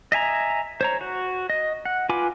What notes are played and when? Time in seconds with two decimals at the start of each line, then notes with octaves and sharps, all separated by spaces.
0.12 D#5 E5 G#5 A#5
0.81 C5 C#5 A#5
1.01 F#4
1.50 D#5
1.85 F#5
2.09 F4 B4 G#5 B5 D6